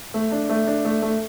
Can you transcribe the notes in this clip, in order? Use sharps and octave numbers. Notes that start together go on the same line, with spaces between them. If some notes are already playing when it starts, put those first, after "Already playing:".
A3
D4
A3
D4
A3
A3